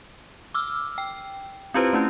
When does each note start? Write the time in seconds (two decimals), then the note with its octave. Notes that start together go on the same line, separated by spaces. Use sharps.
0.54 D6 E6 F6
0.98 G5
1.74 C4 E4 F4 G4 B4 C5
1.93 A3 C#4 E4